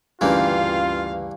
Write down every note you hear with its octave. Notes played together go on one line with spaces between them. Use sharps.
D2 G2 C#3 E3 A#3 F4 F5 G5